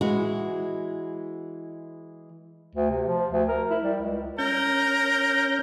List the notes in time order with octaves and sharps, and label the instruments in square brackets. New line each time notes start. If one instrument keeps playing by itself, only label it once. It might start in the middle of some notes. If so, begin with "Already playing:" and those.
[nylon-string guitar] E3 G#3 F#4 G#4
[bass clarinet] D2
C3
F3
D2
A#4
E4
G3
C#2
[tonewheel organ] C#4 G6 [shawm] A#4